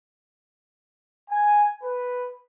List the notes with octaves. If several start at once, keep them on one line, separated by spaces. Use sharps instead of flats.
G#5
B4